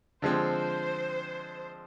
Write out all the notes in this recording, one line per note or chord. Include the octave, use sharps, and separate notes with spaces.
D3 F3 G#3 C4 C5